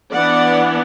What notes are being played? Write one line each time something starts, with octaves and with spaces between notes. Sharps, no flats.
E3 B3 D4 D5 F#5